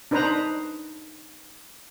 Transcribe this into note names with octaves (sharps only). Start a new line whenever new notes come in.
D4 D#4 B4 C5 A#5